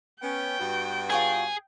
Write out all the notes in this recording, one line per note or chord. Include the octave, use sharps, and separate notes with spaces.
B3 C#4 G5
G2 B3 F#4
F4 G#4 C#5 G#5